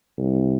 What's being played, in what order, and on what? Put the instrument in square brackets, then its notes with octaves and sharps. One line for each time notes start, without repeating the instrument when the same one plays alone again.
[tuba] C2